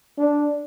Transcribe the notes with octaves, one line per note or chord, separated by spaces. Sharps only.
D4